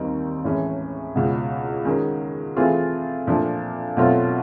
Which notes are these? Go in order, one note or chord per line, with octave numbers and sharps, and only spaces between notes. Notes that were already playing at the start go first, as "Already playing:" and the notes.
Already playing: D#2 D#3 G3 C4 D#4
A2 E3 G#3 C#4
C#2 B2 G#3
D#3 G#3 C#4
E3 A3 C4 F4 G#4
A#2 F3 A3 D4
B2 F#3 A3 C4 F4